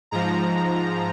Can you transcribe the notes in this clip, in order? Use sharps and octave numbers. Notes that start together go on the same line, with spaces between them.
G#2 F3 A#5